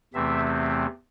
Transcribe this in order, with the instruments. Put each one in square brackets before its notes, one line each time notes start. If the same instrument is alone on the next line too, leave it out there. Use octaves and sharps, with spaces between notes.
[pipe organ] E2 C3 E3 A3 C4 E5